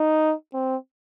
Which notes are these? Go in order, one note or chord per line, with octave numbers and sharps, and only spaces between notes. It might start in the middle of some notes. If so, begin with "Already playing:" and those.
Already playing: D#4
C4